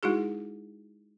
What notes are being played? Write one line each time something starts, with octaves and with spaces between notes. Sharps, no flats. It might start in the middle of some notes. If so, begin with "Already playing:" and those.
G#3 D#4 E4 F#4 G#4